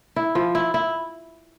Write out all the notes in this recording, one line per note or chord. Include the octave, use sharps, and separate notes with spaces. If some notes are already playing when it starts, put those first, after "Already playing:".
E4
F3
E4
E4